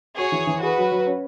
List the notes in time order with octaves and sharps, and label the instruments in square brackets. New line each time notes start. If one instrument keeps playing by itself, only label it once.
[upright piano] F#4 [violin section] G#4 C#5
[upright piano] E3
E3
[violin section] F#4 B4 [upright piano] G#4
[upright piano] F#3
F#3
C#4